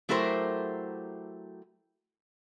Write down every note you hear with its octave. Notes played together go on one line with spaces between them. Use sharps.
F#3 A3 E4 G4 A#4 C5